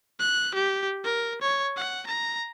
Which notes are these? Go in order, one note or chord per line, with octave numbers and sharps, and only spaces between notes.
F#6
G4
A#4
C#5
F#5
A#5